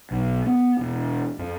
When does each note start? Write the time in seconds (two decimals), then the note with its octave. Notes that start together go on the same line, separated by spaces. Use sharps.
0.11 B1
0.46 B3
0.79 E1
1.38 F2